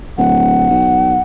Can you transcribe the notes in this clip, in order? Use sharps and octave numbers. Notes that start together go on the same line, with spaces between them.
D1 F#5
B1